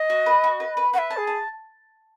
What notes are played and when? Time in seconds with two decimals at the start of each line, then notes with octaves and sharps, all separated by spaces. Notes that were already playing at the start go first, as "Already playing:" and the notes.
Already playing: D#5
0.10 F#4
0.26 B4
0.44 F#4
0.60 B4
0.77 B4
0.93 B4 F#5
0.98 E5
1.10 A5
1.17 G#4
1.27 A5